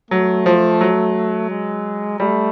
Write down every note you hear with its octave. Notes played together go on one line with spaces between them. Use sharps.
F#3 A3
F3
F#3
G#3
G3 A3